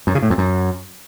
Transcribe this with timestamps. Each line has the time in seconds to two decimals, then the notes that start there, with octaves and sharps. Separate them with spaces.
0.07 F#2
0.15 C#3
0.23 A2
0.30 F2
0.38 F#2